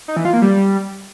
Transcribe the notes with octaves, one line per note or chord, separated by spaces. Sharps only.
D#4
E3
F4
A#3
G3